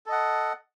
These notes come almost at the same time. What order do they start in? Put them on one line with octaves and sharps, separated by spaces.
A4 D#5 F#5